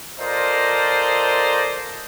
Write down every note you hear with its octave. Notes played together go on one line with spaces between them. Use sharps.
F4 A4 A#4 C5 D5 D#5